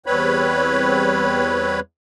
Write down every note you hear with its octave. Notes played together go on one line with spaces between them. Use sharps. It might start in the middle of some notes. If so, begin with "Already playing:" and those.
E2 G3 C4 B4 C#5 B5